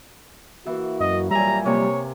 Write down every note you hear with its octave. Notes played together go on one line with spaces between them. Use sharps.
E3 A#3 E4 F#4
F#2 D#5
A#2 F#3 G3 E5 G#5 A#5
C3 A#3 C#5